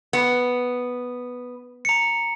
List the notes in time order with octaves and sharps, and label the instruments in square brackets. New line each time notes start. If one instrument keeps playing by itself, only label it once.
[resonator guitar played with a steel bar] B3
[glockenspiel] A#5 C#7